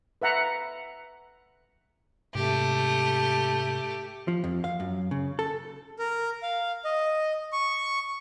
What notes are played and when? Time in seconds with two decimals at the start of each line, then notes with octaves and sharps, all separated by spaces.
0.22 B4 E5 F#5 A#5
2.35 G#2 C3 A3 G4
4.28 F3
4.44 F2
4.64 F5
4.80 F#2
5.11 C#3
5.39 A4
5.99 A#4
6.43 F5
6.84 D#5
7.52 C#6